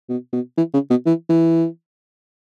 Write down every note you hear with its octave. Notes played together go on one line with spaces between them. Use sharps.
B2
B2
E3
C#3
B2
E3
E3